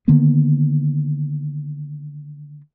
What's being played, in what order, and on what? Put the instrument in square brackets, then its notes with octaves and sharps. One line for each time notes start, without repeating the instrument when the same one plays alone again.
[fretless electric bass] D3 D#3 A#3 B3